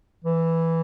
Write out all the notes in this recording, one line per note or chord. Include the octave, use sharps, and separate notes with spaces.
E3